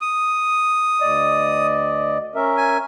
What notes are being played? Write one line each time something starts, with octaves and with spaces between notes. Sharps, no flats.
D#6
D2 D5 D#5
C#4 A#4 E5
G#5